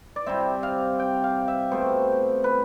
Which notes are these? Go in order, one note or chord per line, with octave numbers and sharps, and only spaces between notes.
D5
C3 G3 C4 E5
F5
G5
F5
E5
B2 A3 C4 C5
B4